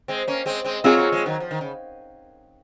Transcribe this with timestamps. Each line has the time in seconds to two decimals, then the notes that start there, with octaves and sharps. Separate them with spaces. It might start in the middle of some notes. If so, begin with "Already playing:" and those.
0.08 G#3 C4
0.28 A#3 C#4
0.46 G#3 C4
0.64 G#3 C4
0.84 F#3 A#3 C4 F4 G#4 C#5
0.97 F#3 A#3
1.12 F3 G#3
1.26 D#3 F#3
1.40 F3
1.51 D#3
1.61 C#3